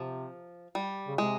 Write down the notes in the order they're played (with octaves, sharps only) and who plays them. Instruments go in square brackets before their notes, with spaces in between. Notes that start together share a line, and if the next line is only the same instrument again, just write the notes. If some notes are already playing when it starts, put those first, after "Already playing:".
Already playing: [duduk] C3 [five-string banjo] F3
[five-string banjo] G3
[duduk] C#3
[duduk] C3 [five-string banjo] G#3